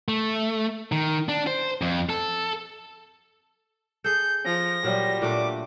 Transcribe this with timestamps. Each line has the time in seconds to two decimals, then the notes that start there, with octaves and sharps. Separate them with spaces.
0.08 A3
0.92 D#3
1.29 D4
1.47 C5
1.82 F2
2.09 A4
4.04 G#4 A4 G6
4.45 F3 A#6
4.84 A#2 F#3 G3 F4
5.22 A#2 A3 D4 D6